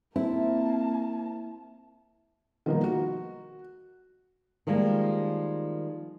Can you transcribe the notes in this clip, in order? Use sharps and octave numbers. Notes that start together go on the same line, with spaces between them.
A#3 C4 E4 A5
D#3 F3 G3 A#3 B3 D#4
F#4
D#3 F3 G3 G#3 A#3